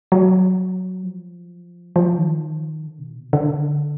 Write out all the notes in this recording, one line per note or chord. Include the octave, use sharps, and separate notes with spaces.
F#3
F3
F3
D#3
D3
B2
A#2
B2
D3